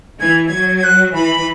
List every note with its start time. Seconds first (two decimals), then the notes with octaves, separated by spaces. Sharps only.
0.21 E3 G#6
0.48 F#3 G#6
0.77 G#6
0.84 F#6
1.15 E3 B5